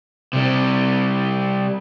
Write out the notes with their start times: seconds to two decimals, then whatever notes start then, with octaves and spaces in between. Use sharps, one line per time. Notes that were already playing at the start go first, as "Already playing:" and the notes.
0.33 C3 G3